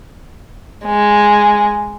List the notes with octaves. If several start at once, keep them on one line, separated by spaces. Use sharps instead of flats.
G#3